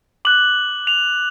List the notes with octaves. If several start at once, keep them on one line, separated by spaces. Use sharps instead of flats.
D6 F#6 F#7
F7